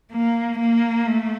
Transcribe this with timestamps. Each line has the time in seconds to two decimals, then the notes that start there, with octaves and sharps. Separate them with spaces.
0.12 A#3
0.59 A#3
1.06 A3